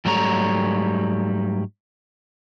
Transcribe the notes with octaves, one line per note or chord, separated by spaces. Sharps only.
G#2 F#3 G3 A3 C#5 A#5